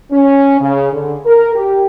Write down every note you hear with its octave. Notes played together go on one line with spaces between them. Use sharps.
C#4
C#3
D3
A#4
G4